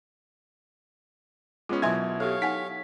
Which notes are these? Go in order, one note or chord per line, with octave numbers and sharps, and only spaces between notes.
G#3 B3 C#4 F4
B2 F#3 E4 A#4 E5 G#5 C6 G#6
G4 A4 C#5 F5
D#4 F#5 G#5 B6